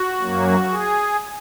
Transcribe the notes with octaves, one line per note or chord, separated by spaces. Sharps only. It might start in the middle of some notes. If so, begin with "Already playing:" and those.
Already playing: F#4
F#2 F#3 A#3
G#4